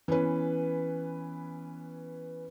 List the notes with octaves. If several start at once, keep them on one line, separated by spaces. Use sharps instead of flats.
E3 B3 C#4 B4